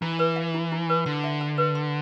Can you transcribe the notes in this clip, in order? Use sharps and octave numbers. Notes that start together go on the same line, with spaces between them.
E3 E4
B4
F5
E4
E4
B4
D3 C6
E5
A5
B4
C6